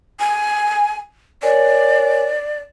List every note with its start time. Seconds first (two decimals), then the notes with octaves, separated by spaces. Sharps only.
0.20 G#5
1.43 A#4 C#5 D5 G#5